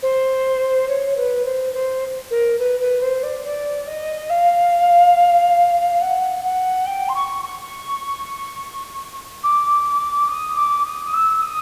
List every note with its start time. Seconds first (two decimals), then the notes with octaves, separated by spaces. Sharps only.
0.02 C5
0.88 C#5
1.16 B4
1.45 C5
1.73 C5
2.30 A#4
2.58 B4
2.80 B4
3.01 C5
3.23 D5
3.44 D5
3.87 D#5
4.29 F5
6.01 F#5
6.44 F#5
6.86 G5
7.08 C6
7.14 C#6
7.42 C#6
9.43 D6
10.28 D#6
10.57 D6
10.85 D#6
11.05 D#6
11.13 E6
11.42 D#6